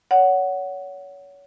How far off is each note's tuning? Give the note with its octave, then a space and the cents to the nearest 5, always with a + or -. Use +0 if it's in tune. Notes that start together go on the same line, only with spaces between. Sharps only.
C#5 +30 F#5 +5